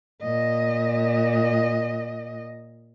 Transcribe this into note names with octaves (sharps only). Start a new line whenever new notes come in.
A#2 D#5